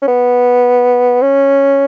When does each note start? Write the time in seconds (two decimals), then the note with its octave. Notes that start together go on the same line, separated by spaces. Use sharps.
0.02 C#4
0.08 B3
1.22 C#4